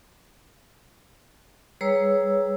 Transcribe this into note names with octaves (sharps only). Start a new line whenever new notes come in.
G3 G#4 B4 C#5 A#5 E6